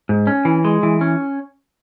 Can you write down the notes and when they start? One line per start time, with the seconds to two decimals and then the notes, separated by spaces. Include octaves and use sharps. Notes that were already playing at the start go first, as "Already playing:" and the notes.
0.09 G#2
0.27 C#4
0.45 E3
0.65 G#3
0.83 E3
1.01 C#4